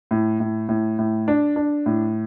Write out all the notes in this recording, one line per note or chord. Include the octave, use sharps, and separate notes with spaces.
A2
A2
A2
A2
D4
D4
A2